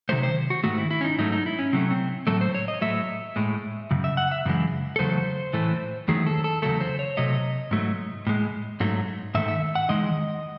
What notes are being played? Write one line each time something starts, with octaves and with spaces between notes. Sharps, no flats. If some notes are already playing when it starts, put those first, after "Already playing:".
C3 D#3 F#3 A3 C5
C5
F#4
G#2 D#3 A3 F#4
E4
E4
C#4
D#4
G#2 F#3 A3 D#4
D#4
E4
C#4
C3 F#3 A3 C4
C4
A2 F#3 A3 A4
C5
C#5
D#5
A2 F#3 A3 E5
A2 G#3
F#2 C#3
E5
F#5
E5
F#2 C#3 E3 G#3
A4
E2 C#3 F#3 A3 C5
A2 E3 A3
E2 D#3 F#3 A3 G#4
A4
A4
E2 C#3 F#3 A3 A4
C5
C#5
C3 F#3 A3 D#5
G#2 F#3 A3
A2 G#3
G#2 F#3 A3
G#2 D#3 A3 E5
E5
F#5
E2 D#3 G#3 D#5